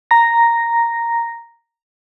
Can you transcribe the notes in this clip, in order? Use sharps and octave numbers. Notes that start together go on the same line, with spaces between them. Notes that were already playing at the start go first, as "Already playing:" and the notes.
A#5 A#6